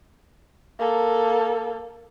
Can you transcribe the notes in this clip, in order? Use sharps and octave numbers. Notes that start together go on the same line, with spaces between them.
A#3 A4